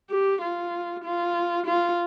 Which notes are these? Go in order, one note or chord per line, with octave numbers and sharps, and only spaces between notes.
G4
F4
F4
F4